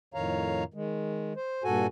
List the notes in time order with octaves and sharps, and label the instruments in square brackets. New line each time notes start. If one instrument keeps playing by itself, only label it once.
[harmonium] F2 A2 D#3 C#5 F5 A#5
D#3 G#3
C5
G2 A#2 F#4 A4 G#5